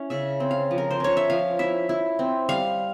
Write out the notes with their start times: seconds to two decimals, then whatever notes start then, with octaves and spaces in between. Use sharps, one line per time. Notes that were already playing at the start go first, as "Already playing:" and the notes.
Already playing: C#4 E4
0.10 C#3 E5
0.40 C4
0.51 F5
0.71 F3
0.78 A#4
0.91 C5
1.00 C#4 C#5
1.17 E5
1.30 F3 F5
1.59 E4 E5
1.89 E4
2.19 C4
2.49 G3 F5